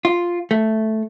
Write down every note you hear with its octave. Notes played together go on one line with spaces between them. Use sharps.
F4
A3